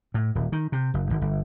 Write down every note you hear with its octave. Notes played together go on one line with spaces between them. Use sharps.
A2
D#1
D#3
C3
F#1
G#1
G1